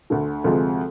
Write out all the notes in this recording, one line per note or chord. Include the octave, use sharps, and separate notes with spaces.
D2 D3 A3
D2 C3 F3 G#3